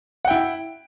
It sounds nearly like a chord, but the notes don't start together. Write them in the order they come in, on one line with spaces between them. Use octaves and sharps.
F#5 G5 E4